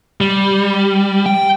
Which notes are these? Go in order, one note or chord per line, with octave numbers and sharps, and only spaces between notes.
G3
G5